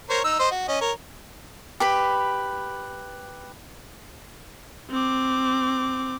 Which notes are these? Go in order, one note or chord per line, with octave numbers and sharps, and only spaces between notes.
A#4 C5 C#5
D#4 E6
C5 D#5
F#4
C#4 D#5
A#4 C#5
G4 B4 B5
C4 D6